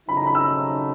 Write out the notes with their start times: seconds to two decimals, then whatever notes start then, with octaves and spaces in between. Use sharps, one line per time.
0.08 C#3 F#3 A3 C4 D#4 B5
0.17 A#5
0.26 B5
0.35 E6